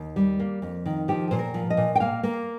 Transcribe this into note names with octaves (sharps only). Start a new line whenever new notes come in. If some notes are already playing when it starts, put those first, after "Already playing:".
Already playing: D#2
G3
A#3
F2
D#3
F3 G4
A#2 C5
A#4
F3
D#5
A#2
G5
A#3 F5
A#3